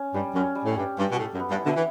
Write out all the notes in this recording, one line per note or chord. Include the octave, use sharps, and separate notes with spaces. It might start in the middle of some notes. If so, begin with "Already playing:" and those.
Already playing: C#4
G2 G3
F#2 C#4
G3
A2
G2 G4
G2 G4
B2
A2 A4
F#2
B3
G2
E4
B2 D3
E3